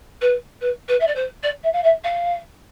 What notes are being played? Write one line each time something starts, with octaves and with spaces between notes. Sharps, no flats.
B4
B4
B4
E5
D5
C5
D5
E5
F5
E5
F5